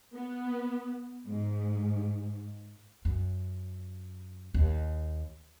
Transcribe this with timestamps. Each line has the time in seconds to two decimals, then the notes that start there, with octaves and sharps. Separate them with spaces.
0.15 B3
1.28 G#2
3.05 F#2
4.54 D#2